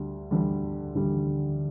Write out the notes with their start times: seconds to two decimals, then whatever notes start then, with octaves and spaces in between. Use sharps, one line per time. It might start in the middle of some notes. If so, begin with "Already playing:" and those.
Already playing: D2 D3 G3
0.31 D2 D3 G3
0.95 D2 D3 G3